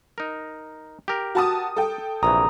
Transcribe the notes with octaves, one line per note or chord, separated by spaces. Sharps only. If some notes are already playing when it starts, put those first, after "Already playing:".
D#4 A#4
G4 A#4
F#4 A5 D#6
A4 G5
A#1 C3 E3 A#5 D#6